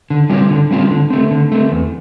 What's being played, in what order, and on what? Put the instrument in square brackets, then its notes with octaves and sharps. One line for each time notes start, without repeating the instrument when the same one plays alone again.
[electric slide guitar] D3
G3 C4 F4
D3
G3 C4 F4
D3
A3 C4
D3
A3 C4
E2